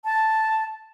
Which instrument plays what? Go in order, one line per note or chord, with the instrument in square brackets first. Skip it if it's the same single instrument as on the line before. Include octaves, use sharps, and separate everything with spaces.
[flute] A5